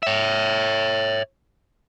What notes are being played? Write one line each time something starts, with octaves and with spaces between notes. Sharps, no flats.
C#5 E5